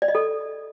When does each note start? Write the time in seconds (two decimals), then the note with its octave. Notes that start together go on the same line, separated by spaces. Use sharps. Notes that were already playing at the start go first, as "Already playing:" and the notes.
0.02 D5
0.08 D#5
0.15 A4